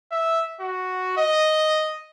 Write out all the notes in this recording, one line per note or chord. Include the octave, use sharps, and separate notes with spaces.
E5
F#4
D#5